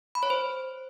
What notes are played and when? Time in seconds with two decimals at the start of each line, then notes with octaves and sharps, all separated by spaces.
0.15 B5
0.23 C#5
0.30 C5